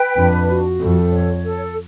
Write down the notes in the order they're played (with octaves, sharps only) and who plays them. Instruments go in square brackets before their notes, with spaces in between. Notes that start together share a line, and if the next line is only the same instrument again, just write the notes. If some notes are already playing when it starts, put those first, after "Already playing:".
Already playing: [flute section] B4 G5
[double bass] F2 [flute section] D4
[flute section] F#4
[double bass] F2 [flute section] A4
[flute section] C#5
A4